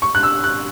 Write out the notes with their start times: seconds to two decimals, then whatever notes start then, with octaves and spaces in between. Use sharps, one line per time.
0.02 C#6
0.15 F#6
0.23 E6
0.44 F#6